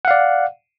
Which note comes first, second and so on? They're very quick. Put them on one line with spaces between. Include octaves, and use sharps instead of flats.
F#5 F5 D5